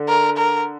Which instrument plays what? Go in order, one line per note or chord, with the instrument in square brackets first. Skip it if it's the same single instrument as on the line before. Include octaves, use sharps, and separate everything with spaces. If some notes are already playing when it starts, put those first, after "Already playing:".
Already playing: [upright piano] D3
[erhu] A#4
A#4